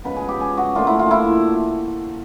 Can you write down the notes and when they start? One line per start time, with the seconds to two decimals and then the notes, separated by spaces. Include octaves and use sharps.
0.04 C#3 F3 G#3 B3 B4
0.16 G#4
0.29 G4
0.41 G#4
0.57 F#4
0.75 A#2 F3 A3 D4 F4
0.87 E4
0.99 F4
1.11 E4